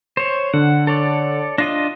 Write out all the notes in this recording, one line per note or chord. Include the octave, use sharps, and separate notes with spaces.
C5 C#5
D3 F#5
A4 C#5 D5
D4 F4 D#5 A#6